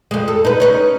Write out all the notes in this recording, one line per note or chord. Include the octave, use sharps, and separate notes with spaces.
F2 G#3
A4
D#4 B4
C#4 D#4 B4